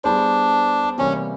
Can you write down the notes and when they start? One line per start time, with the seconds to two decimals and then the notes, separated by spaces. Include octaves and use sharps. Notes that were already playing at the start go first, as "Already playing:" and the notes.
0.04 G3 B3 D4 E4 G#4 C5
0.98 C3 E3 G3 A#3 C#4